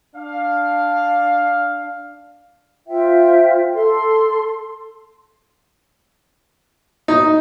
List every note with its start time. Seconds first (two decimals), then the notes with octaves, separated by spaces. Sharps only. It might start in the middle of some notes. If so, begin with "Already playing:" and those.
0.15 D4 F5
2.88 F4 C5 E5 G5
3.74 A4 C6
7.08 D#4